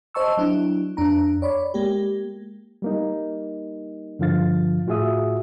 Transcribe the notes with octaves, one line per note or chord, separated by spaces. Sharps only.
C5 D#5 A5 C#6 E6
F#3 D4 E4
F2 D4 A#5
C#5 D5 B5
G#3 A#3 G4
G3 A#3 D#4
G2 D3 F3 F4 F5 A6
A2 F4 F#4 G#4 E5 D#6